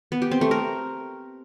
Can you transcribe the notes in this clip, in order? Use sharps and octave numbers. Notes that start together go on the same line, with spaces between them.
B3
G4
C4
A3
A#4